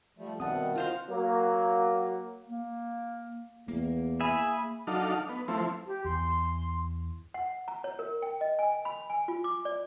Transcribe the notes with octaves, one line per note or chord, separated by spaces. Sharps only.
F3 G3 A3
B2 D#3 G3 C4 E5 F#5 A5 D#6
F4 F#4 C5 F5
F#3 A#3
A#3
E2 A#3
G#4 E5 B5
F#3 D4 D#4 A4 F5
B3
F3 A3 C4 E4
G4
E2 C6
F#5
A#5
C#5
A#4
G5
D#5
G#5
B5
G#5
F4
D6
D5